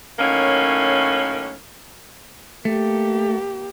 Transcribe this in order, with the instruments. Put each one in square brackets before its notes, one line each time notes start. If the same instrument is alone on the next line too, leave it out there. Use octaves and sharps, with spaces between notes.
[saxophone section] A2 D#3 F#3 A#3 C#4
[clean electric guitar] A3 [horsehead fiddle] A#3 G4